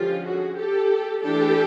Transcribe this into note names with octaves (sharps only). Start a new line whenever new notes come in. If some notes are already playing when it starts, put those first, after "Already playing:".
Already playing: D3 F3 G#3 C#4 F4 G4
F#4 G#4
G4 A4
E3 A3 D4 G4 A4